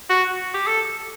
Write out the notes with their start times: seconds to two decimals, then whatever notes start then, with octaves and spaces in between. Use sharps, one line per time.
0.09 F#4
0.54 G4
0.67 A4